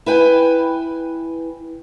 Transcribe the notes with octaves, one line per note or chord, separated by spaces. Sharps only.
E4 B4 G5 G#5